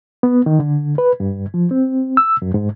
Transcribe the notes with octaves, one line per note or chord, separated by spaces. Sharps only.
B3
D#3
D3
B4
G2
F3
C4
E6
F#2
G#2